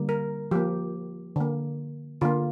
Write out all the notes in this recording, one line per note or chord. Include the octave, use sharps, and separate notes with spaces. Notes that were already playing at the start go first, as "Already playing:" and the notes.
Already playing: D3 G3 A#3
A#4
F3 A#3 G4
D3 A#3
D3 A#3 F4